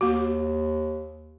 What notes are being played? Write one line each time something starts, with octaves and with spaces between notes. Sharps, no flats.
D#2 A#3 F#4